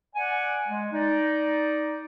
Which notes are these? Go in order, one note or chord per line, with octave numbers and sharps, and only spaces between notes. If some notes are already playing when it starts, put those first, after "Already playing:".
D5 F#5 G#5
G#3
D#4 D5